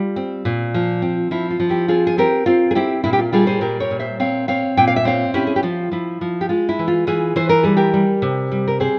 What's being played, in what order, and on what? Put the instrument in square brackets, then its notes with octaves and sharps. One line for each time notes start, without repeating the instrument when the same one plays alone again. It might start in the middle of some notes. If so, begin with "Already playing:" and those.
Already playing: [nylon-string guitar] G3 F4
C4
A#2
F3
C4
F3 E4
F4
F3
E4 G4
C4 F4 G#4
G#4
C4 G4 A#4
C4 F4
G#4
C4 E4 G4
A#2 E4
G4
F4
G3 F4 G#4
G#4 C5
A#2 G4 A#4
A#4 C#5
A#2
C5 E5
C4 C#5 F5
C4 C#5 F5
A#2 G5
F5
E5
C4 C#5 F5
C#4 E4 G4
G#4
G4
F3 F4
F3 E4
F3
G4
G#3 F4
E4
E3
F4
E3 F4 G#4
E3 C5
A#4
G3 G#4
G4 A#4
G3
C3
G3
A#4
C4 G#4 C5